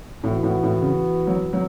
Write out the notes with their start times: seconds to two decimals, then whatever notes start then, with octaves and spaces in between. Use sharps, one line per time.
0.24 A2 E3 B3 F#4
0.43 A2
0.63 A2
0.82 C#3
1.27 F#3
1.53 F#3